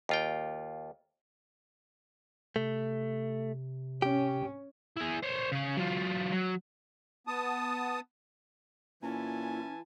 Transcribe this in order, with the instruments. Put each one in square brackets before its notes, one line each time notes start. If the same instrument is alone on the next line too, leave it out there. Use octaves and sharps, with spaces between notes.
[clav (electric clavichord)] D#2 F4 G5
[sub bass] C3 [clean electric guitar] A3
[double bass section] C#4 [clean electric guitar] G4
[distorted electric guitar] E4 G#4
C5 C#5
C#3 C#5
F#3 F4
F#3
[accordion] B3 A5 D#6
[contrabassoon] A#2 [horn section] E3 G#5 A5 [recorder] C#4 [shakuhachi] E4